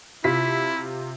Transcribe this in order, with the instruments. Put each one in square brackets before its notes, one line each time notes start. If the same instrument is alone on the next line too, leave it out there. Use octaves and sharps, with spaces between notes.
[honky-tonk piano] C3 F4 B6 [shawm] E4